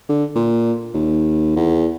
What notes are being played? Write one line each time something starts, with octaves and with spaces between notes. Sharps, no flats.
D3
A#2
D#2
E2